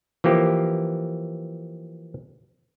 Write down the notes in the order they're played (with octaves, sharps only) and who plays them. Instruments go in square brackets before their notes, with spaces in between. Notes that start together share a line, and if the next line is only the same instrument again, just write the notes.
[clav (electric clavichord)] E3 F3 A#3 G4